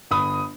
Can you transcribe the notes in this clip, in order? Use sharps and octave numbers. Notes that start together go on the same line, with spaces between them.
G1 B5 D#6